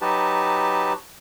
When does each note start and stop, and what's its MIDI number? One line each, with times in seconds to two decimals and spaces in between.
0.01 0.93 54
0.01 0.93 63
0.01 0.93 66
0.01 0.93 67
0.01 0.93 71
0.01 0.93 81